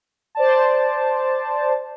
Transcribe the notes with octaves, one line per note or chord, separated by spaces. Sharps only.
C5 D5 A5